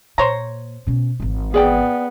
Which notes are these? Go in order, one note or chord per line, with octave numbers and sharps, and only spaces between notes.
A#2 C5 C#5 A#5
B2 C#4
G#1 E3
B3 G#4 D5 G5